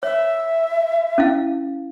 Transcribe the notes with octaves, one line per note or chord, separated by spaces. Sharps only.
C#5 E5
C#4 E4 F5